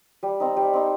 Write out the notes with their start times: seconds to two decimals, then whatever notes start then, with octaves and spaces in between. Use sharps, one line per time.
0.23 G3
0.40 C4 D#4
0.57 G3
0.73 C4 D#4